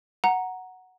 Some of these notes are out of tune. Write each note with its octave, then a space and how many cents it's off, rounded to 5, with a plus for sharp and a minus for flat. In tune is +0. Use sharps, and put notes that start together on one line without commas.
F#5 +0 A#5 +0